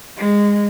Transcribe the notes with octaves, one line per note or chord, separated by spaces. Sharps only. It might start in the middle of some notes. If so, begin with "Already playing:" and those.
G#3